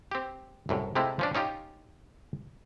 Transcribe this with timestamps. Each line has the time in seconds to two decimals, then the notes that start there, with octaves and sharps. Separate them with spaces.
0.11 C4 G4
0.69 C2 F#2 A2
0.95 C3 G#3 A3 C4 E4 F4
1.19 F3 C#4 D4
1.35 C#4 D#4 F4 G4